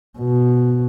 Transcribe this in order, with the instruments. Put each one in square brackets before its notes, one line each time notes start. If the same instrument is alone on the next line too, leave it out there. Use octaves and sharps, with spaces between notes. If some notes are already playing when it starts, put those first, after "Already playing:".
[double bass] B2